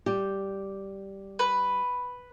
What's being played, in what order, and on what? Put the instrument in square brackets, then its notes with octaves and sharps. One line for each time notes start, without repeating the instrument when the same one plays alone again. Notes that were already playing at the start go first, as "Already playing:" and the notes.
[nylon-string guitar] G3 G4
[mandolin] B4